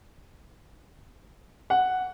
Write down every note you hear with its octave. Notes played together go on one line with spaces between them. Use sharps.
F#5